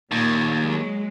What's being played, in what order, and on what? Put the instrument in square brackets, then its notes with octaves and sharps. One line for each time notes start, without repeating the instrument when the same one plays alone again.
[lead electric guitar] D#2 [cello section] A#2
[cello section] F#3 G#3